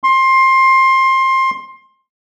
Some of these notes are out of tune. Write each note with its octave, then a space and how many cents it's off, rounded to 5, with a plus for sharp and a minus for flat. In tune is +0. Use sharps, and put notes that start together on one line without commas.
C6 +20